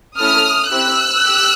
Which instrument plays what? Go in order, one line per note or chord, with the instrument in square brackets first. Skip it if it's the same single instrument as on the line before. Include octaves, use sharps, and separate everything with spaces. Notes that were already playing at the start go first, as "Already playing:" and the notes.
[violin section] A3 C#4 E4 A4 D#6 F6
C4 E4 G4 E6 F#6
G4